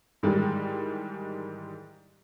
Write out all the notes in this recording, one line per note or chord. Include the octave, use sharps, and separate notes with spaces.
G#2 D#3 E3 G3 G#3